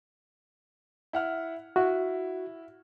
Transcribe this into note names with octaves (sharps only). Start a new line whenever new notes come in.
E4 F#5 F6
E4 F#4